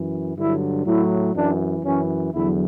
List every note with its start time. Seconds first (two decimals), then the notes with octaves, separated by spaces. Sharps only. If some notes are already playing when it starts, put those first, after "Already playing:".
Already playing: F#2 E3
0.37 G2 D3 F#3 E4
0.86 A2 F#3 E4
1.34 F#2 E3 D4
1.84 F#2 E3 C#4
2.32 E2 D3 F#3 E4